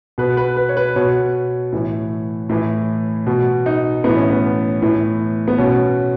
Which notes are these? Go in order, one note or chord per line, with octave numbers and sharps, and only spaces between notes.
B2 B4
B4
B4
C#5
B4
B2 C#5
A2 E3
A2 E3
B2
D#4
A2 E3 B3
C#4
B3
A2 E3
B3
B2 C#4